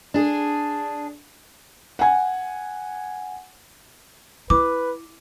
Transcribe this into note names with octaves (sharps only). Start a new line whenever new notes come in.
D4 G#4
F#5 G#5
E4 B4 D6